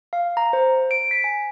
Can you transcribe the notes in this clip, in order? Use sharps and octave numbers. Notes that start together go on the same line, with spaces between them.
F5
A#5
C5
D7
B6
G#5